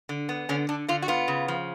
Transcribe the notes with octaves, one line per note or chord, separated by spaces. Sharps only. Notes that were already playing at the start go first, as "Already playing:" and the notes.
D3
B3
D3 C#4
D3 D4
D3 F4
F#4
B3 F4
C#3
F3